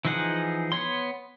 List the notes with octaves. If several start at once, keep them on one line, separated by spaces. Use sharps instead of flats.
E3 F3 D#4 G#4 F#5
B3 C#5 C6